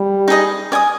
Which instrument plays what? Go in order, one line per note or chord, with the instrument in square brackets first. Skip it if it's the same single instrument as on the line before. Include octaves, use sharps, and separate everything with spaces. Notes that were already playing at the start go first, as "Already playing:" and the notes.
Already playing: [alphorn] G3
[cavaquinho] D#4 G#4 D#5
D5 G#5 D#6